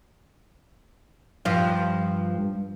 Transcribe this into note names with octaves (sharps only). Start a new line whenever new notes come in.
G2 F3 F4